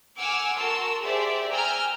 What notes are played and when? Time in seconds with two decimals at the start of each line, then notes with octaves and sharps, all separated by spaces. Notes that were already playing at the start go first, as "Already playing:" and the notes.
0.17 F#5 G#5 D6 E6 F6
0.58 F#4 A#4 A5 C6 E6
1.03 G4 G#4 C5 D5 E5
1.51 G5 G#5 A#5 E6 F6 G6